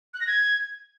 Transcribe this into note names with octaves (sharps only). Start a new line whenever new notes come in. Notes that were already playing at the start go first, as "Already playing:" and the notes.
F#6
A#6
G#6